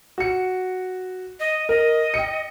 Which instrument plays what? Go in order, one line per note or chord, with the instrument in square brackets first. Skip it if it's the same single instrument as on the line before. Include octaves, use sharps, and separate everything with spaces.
[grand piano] F#4 C#7
[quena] D#5
[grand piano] A#4 [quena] D#5
[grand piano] G5 C#7